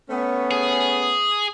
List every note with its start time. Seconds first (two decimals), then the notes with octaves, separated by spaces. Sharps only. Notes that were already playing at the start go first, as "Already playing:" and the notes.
0.10 A3 B3 C#4
0.51 G#4